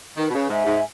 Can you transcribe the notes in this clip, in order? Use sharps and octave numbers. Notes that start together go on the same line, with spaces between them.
D#3 B4
B2
C#3
G#2 E5 G#5
G#2